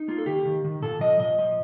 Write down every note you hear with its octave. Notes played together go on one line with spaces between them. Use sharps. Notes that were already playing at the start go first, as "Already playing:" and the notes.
Already playing: D#4
A#3 F4
A4
D#3 G4
D#3
D#3
A#2 A4
F3 D#5
A#2 D#5
F3